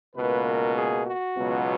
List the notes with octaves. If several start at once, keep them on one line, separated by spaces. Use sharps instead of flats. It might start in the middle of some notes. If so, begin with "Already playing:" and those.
C#2 B2 A#3 B4
A#4
G#4
F#4
C#2 B2 F#3 B3